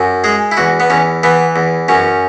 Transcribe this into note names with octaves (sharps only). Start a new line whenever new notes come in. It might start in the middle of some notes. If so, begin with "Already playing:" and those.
Already playing: F#2
G#3 G#4
E4
E2 F#4
B3
E2 C#4
E3 B3
E2
F#2 C#4